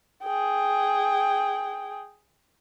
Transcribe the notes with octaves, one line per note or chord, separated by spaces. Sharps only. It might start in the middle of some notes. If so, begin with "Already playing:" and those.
G#4 G5